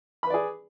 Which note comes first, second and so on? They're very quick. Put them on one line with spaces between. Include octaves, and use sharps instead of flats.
B5 B4 D5 G#4